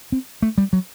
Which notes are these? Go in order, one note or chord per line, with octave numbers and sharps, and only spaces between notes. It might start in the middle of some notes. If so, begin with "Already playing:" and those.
C4
A3
G3
F#3